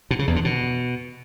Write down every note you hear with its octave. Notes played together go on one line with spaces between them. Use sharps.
B2
C#3
E2
D3
B2